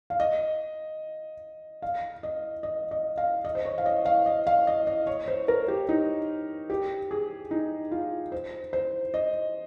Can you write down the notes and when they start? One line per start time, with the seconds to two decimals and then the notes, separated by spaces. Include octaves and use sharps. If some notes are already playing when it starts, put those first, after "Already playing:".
0.10 F5
0.20 D#5
1.82 F5
2.23 D#5
2.63 D#5
2.91 D#5
3.18 F5
3.45 D#5
3.55 C5
3.65 C#5
3.78 F5
3.86 D#5
4.06 F5
4.26 D#5
4.47 F5
4.67 D#5
4.87 D#5
5.07 C#5
5.28 C5
5.48 A#4
5.68 G4
5.89 D#4
6.70 G4
7.11 G#4
7.51 D#4
7.91 F4
8.32 C5
8.73 C5
9.14 D#5